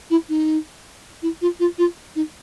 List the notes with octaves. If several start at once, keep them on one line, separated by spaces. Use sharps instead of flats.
E4
D#4
E4
F4
F4
F4
D#4